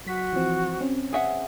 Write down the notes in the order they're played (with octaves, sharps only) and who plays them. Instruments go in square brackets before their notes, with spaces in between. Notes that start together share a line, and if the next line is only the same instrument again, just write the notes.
[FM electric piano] F#3 B6 [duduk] F#4
[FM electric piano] E3 F3 C4
C4 C#4
[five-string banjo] G#4 E5 F#5